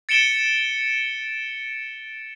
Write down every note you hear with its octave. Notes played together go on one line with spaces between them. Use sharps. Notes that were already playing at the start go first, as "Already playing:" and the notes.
A6 C#7 D7 E7 G7